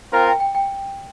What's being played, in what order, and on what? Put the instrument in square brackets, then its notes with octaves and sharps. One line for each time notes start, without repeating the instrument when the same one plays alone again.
[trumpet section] C4 F4 A#4 [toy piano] G5
[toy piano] G5
G5
G5